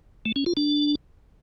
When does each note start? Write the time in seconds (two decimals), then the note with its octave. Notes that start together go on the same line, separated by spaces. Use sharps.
0.25 A3
0.36 C#4
0.46 F4
0.57 D4